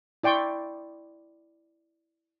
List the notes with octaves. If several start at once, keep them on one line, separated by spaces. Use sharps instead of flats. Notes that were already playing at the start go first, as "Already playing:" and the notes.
E4 D5 G5 C6 C#6